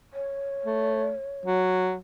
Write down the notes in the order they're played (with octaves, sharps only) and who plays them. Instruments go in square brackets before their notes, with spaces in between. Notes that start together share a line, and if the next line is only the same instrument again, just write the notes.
[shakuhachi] C#5
[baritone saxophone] A3
F#3